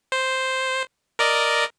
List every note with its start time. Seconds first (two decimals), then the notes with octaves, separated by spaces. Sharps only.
0.12 C5
1.19 A#4 D5 D#5